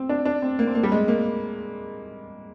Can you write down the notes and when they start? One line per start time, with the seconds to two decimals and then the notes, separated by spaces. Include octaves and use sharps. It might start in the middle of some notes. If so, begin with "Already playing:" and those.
Already playing: C4
0.09 D4
0.25 D4
0.42 C4
0.59 A#3
0.67 C4
0.75 A#3
0.83 G3
0.92 G#3
1.08 A#3